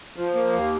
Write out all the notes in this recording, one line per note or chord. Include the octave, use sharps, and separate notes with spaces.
F3
A#3
D#2